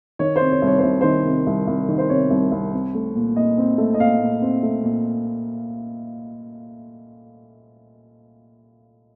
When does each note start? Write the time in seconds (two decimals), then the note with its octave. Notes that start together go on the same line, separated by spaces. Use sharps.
0.19 D#3 C#5
0.36 C5
0.41 C3
0.51 C#5
0.62 C2 C#5
0.78 C2 C5
1.01 D#3 C5
1.25 C3
1.47 C2
1.67 C2
1.89 D#3
1.98 C5
2.09 C3 C#5
2.31 C2
2.52 C2
2.73 C4
2.94 A3
3.16 A#2
3.36 A#2 D#5
3.58 C4
3.78 A3
3.94 D#5
3.99 A#2 F5
4.20 A#2
4.42 C4
4.63 A3
4.84 A#2